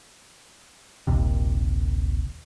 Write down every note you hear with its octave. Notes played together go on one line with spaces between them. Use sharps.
D#1 A#1 D#2 C3